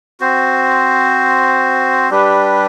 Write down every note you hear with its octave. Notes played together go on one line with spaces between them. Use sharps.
C4 F#4 C5
G3 D4 G4 B4